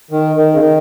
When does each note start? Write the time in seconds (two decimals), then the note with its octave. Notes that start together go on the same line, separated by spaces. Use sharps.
0.11 D#3
0.35 D#3
0.53 C#3
0.59 D#3